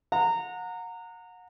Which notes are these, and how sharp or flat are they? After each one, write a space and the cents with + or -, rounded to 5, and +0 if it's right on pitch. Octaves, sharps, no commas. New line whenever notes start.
F#5 -30 A#5 -20